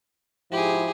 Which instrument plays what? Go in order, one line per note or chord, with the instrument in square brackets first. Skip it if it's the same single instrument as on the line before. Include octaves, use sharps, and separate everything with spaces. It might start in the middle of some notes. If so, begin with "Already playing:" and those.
[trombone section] G#2 F3 E4 [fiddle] G4 G#4